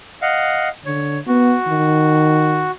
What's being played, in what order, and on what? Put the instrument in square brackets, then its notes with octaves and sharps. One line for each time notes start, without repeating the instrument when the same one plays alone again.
[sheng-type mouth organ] D#5 F5 F#5
[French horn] D3 [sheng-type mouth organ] C#5
[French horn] B3 [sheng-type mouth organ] F#4
[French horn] D#3